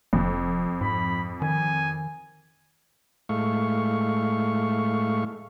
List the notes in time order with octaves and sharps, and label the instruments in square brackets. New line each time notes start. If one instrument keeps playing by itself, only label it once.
[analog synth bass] F1 [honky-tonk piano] F2
[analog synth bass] G#2 [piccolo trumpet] B5
[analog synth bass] D#3 [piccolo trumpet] G#5
[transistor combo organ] A2 G#3 A3 F5 C#6